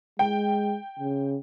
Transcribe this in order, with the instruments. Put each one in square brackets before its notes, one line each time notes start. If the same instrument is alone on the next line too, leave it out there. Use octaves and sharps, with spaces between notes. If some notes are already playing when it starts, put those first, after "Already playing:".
[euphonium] G#3 [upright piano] G5
[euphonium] C#3